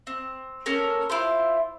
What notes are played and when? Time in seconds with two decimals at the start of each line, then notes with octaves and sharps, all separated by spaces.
0.07 C4
0.66 A#3 C#4 A4 A#4
1.10 E4 F4 C5